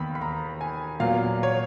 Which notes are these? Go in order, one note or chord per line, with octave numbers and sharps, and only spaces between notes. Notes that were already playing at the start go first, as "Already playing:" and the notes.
Already playing: D#2 D#3 B3 B5
B5
A#5
G#5
A#2 F#3 B3 F5
C#5